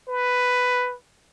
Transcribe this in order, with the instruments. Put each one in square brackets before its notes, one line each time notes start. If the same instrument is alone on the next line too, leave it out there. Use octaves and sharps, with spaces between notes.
[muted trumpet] B4